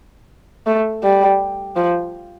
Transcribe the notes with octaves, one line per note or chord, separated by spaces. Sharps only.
A3
G3
F3